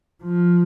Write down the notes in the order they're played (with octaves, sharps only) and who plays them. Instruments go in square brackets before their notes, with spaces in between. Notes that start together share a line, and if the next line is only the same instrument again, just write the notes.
[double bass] F3